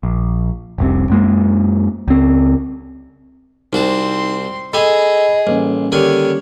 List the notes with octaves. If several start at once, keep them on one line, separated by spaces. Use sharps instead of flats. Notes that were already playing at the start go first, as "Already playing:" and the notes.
A#1
F1 C2 C3
F#2 G#3 A#3
C#2 C4
C2 C4 D#4 F#4 A5 C6
G#4 A4 D#5 G#5 B5
A1 G3 A#3 C#4
D3 D#3 G4 C#5 G#5